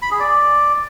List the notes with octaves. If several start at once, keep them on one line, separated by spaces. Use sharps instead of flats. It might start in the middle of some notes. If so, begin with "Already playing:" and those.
B5
G#4
D5